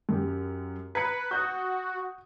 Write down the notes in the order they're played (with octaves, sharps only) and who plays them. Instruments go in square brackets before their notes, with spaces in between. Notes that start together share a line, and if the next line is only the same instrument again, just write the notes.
[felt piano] F#2 G4
[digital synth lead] B4 [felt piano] A#5 G#6 C#7
[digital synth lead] F#4 [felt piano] D#6 F#6 G6